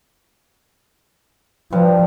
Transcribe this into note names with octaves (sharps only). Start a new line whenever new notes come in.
G2 F3